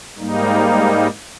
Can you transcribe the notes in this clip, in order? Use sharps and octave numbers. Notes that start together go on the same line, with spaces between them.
G#2 G3 A#3 D#4